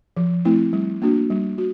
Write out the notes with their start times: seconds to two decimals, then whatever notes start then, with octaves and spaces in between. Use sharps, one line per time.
0.17 F3
0.45 A3 C4 E4
0.73 G3
1.02 A#3 D4 F#4
1.30 G3
1.58 F#4